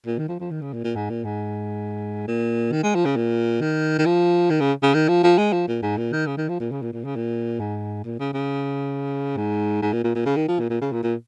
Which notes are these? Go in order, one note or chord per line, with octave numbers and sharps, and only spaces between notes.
A#2
D#3
F3
F3
D#3
C#3
A#2
A#2
G#2
A#2
G#2
A#2
D#3
G#3
F3
C#3
A#2
D#3
D#3
F3
D#3
C#3
C#3
D#3
F3
F3
G#3
F3
A#2
G#2
A#2
D#3
C#3
D#3
F3
A#2
C#3
A#2
A#2
C#3
A#2
G#2
A#2
C#3
C#3
G#2
G#2
A#2
A#2
A#2
C#3
D#3
F3
A#2
A#2
C#3
A#2
A#2